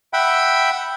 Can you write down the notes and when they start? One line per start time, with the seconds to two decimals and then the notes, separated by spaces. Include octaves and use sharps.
0.13 E5 F#5 G5 B5